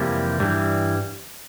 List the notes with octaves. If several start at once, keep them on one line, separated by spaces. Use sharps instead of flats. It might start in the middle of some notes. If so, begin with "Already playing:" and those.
Already playing: F2 C3 E3 G3 A#3
G2 E3 G3